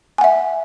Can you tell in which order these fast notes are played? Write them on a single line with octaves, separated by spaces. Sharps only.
G#5 F#5 E5